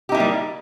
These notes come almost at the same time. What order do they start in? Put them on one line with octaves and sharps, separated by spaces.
G4 D#4 E4 A#3 G3